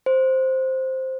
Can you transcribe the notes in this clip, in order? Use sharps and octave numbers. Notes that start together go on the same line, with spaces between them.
C5